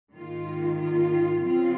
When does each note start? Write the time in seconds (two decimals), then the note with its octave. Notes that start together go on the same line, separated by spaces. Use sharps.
0.12 G#2 D#3 A#3 F4
0.79 F4
1.43 C#3 F3 C4 F4